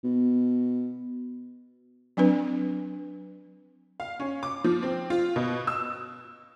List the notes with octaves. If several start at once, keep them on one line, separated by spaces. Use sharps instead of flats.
B2
F#3 C4 D4 B4
F5
C#4
D6
F3
C4
F4
B2
E6